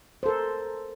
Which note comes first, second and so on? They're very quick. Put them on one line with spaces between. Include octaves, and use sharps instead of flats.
C5 A4 A#4